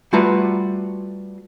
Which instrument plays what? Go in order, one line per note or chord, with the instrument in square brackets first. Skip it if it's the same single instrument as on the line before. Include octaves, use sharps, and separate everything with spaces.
[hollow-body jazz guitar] G3 A3 F4 F#4 B4 A#5